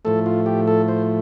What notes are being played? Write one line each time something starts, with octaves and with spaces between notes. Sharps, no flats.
A2 F3 A3 A4
F4
G4
A4
C5